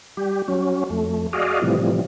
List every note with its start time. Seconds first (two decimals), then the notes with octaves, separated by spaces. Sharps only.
0.17 G3 G4
0.48 F#3 C#4
0.90 F2 A3
1.33 F#4 G#4 D5 D#5 F5
1.62 A2 C3 E3 F3 G3